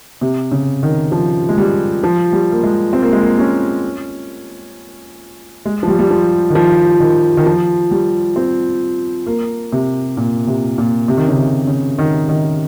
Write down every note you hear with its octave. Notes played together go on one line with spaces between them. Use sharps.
C3
C#3
D#3
F3
G#3
G3
F3
G3
A#3
G#3
C4
A#3
G#3
A#3
C#4
G#3
F3
G3
G3
F3
D#3
F3
D#3
D#3
F3
G3
C4
A#3
C3
A#2
C3
A#2
C3
D#3
C#3
C3
C#3
D#3
D#3